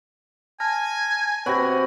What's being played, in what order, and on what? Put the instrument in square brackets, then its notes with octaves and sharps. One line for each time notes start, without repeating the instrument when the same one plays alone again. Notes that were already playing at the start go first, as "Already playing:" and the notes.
[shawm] G#5 [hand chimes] A5 F6 A#6
[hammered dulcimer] C3 F#4 B4 [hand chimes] C#5 A#6